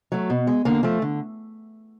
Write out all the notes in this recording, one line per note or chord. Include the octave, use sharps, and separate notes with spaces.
F#3 A3
B2
G#3
D3 A#3
F3 A3
D3